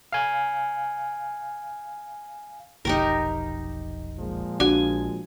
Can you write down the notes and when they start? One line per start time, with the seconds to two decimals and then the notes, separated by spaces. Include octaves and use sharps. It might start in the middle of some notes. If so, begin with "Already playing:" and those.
0.13 F5 G#5
2.85 F1 B1 F2 D#4 G4 A#4
4.20 A#2 F3 G#3
4.60 A#1 D4 F#4 G#5